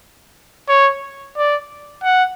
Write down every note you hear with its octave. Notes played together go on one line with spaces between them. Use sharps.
C#5
D5
F#5